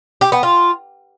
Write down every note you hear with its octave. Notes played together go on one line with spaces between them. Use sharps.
G4
B3
F4